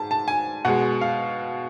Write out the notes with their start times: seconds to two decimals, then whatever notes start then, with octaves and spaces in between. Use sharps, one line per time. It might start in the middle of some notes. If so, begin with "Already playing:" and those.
Already playing: G#2 A5
0.11 A5
0.28 G#5
0.65 B2 G#3 F#5
1.01 F5